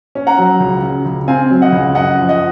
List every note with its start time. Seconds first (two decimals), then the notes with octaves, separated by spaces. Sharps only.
0.15 C#4
0.27 F#5 A#5
0.38 F#3
0.60 C#2
0.83 C#3
1.05 C#2
1.28 C4 F5 G#5
1.50 F#3
1.62 D#5 F#5
1.72 C#2
1.95 F#2 D#5 F#5
2.18 F3
2.29 D#5 F#5